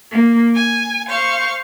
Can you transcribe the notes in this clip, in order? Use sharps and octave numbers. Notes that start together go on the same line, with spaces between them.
A#3
G#5
C5 F5 C#6